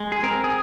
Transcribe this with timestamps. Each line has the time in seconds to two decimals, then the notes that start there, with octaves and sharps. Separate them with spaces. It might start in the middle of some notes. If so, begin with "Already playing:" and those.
Already playing: G#3
0.12 G#4
0.23 C4 A#4
0.44 G#4